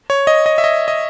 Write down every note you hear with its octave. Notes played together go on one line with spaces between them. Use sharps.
C#5
D#5
D#5
E5
D#5
D#5